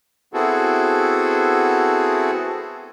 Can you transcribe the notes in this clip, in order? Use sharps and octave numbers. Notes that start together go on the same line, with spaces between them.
B3 C4 E4 F#4 G#4 A4